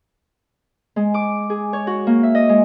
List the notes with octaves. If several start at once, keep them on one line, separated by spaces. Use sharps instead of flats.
G#3
D6
G#4
C#5
F#4
A#3
E5
D#5
G#3